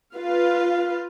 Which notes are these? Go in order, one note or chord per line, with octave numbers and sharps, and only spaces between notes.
F4 B4 F5